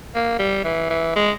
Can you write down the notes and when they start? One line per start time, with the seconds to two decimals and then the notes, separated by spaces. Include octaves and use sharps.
0.15 A#3
0.39 G3
0.64 E3
0.90 E3
1.16 G#3